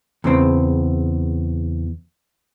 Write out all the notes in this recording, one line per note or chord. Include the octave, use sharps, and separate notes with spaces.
E2 C#3 C4